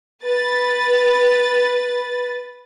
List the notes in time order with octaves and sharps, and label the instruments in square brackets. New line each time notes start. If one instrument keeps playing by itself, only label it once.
[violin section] B4 A6